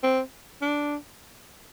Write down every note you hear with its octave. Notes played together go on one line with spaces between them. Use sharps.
C4
D4